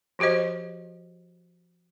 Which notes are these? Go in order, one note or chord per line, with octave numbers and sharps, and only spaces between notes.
F3 F#4 G4 C5 D#5